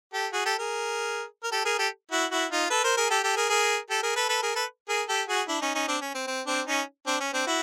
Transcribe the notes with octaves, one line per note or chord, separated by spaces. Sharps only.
G4 A4
F#4 G#4
G4 A4
G#4 A#4
A#4
G4 A4
G#4 A#4
G4 A4
E4 F#4
E4 F#4
D#4 F4
A4 B4
A#4 C5
G#4 A#4
G4 A4
G4 A4
G#4 A#4
G#4 A#4
G4 A4
G#4 A#4
A4 B4
A4 B4
G#4 A#4
A4 B4
G#4 A#4
G4 A4
F#4 G#4
D4 E4
C#4 D#4
C#4 D#4
C4 D4
C#4
C4
C4
C4 D4
C#4 D#4
C4 D4
C#4
C4 D4
E4 F#4